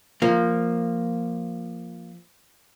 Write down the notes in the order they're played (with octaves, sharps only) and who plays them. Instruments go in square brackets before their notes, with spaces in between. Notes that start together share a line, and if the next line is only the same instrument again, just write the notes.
[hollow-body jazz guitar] F3 A#3